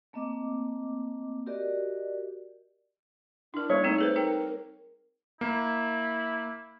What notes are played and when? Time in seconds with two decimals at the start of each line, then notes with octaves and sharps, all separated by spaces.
0.13 A3 A#3 C4 D#5 D6
1.46 F#4 G4 A#4 D5 D#5
3.54 D4 E4 A#4
3.70 G3 A#3 C#5
3.84 A3 C4 D#4 A4
3.98 G#4 B4 C5
4.16 D#4 A4 A#4 G5
5.41 A#3 E4